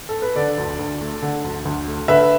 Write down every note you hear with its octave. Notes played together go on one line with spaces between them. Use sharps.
A4
B4
D3 A4 D5
D2
D2
A3
D3
D2
D2
A3
D3 B4 E5